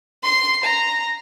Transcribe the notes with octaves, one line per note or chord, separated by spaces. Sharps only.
C6 C7
A#5